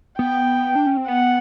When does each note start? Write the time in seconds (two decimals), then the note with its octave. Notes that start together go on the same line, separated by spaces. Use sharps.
0.18 B3 G5
0.75 D4
0.86 C#4
0.97 C4
1.08 B3 F#5